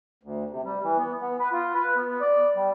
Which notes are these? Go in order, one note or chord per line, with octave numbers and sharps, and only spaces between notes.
D2
C3
G3
E3
B3
B3
B4
F4
B4
B3
D5
G3